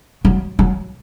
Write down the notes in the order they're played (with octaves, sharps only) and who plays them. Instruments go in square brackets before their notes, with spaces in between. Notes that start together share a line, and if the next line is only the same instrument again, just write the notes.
[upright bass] F#3
F#3